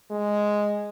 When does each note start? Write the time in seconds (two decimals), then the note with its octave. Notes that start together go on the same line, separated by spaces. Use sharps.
0.11 G#3